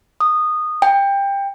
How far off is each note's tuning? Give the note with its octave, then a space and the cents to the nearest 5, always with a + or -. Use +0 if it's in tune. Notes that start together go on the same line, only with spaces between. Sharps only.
D#6 -15
G5 +20